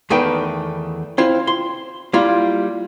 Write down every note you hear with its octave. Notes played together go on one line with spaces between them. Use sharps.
E2 D#3 A3 D#4 B4 G5
C4 E4 F4 C5
C6
G3 A#3 E4 F4